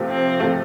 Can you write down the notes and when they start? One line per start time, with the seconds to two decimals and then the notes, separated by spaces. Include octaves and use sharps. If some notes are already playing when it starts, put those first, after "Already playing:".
Already playing: C3 F3 A3
0.09 C4
0.40 C3 F3 A3